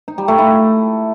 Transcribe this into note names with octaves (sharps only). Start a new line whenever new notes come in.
D#4
G3
A3
E4